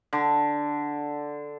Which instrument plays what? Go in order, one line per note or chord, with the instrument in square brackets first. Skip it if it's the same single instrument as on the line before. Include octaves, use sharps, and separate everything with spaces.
[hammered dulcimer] D3